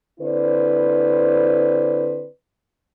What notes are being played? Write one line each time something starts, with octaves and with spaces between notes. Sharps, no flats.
D3 C4 E4 B4 C5 D5